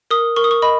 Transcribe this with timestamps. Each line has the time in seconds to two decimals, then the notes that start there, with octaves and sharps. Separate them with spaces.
0.11 A#4 D#6
0.36 A#4 C#6
0.44 D#6
0.51 C#6
0.62 D#5 B5